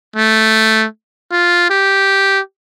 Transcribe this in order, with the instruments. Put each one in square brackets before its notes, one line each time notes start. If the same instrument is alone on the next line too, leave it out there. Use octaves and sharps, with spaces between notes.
[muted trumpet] A3
F4
G4